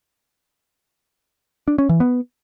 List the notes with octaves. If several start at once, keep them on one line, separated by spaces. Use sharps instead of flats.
D4
C#4
E3
B3